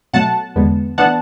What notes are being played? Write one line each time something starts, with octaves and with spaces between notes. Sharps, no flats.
B2 F#3 A3 F#5 A5
E2 D3 G#3 B3
A2 E3 B3 D4 F#5 A5